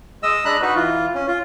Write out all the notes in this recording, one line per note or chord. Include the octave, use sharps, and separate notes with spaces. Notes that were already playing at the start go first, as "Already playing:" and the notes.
G#3 D#5 E6
G#3 D4 A#5 B5 F#6
D#4 F#4 B4
E3 F4
C#4
F4